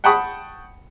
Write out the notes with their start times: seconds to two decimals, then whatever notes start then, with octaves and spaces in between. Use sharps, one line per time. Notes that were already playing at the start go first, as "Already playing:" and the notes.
0.04 F#5 G5 A5 B5 C#6 D#6